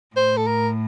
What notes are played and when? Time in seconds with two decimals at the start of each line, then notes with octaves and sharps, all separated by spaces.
0.16 A2 C5
0.37 A4
0.47 A#4